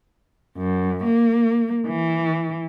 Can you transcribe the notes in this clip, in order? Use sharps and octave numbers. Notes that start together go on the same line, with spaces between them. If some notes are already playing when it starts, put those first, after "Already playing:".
F#2
A#3
E3